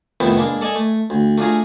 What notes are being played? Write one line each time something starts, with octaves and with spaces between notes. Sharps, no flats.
C2 F2 D#3 A3 B3 E5
G#3 A#3 D4
A4 D5 D#5 G#5
A3
D2
A3 D4 F4 G#4 A#5